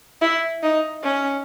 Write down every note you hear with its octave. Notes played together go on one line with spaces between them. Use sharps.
E4
D#4
C#4